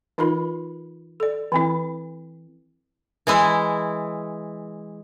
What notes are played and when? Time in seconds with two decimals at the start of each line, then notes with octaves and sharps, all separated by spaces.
0.18 E3 D#4 F4 A#4 B5
1.20 A4 D5
1.52 E3 C4 E4
3.27 E3 G#3 E4